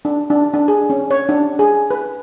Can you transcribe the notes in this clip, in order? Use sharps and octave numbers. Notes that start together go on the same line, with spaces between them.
D4
D4
D4
G#4
C#4
C#5
D4
G#4
B4